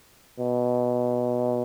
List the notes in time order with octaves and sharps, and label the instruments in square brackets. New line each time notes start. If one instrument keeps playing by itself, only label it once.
[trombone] B2